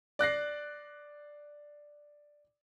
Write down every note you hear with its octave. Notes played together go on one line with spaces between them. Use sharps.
D5 F#6 A#6 C7